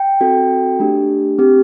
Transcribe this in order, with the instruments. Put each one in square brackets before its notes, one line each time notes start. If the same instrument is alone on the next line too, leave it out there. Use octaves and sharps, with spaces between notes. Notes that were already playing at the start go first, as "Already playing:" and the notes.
Already playing: [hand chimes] G5
C4 F#4 A4
A3 D4 G4
C4 G4